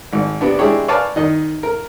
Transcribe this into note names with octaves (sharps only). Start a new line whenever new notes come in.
G#1
C3 B3 D4
G#3 D4 E4 G4 G#4 C#5
B4 C#5 D5 F5 G#5 A5
D#3 D#5
A#4